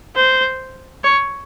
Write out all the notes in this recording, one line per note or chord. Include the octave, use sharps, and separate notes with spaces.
C5
C#5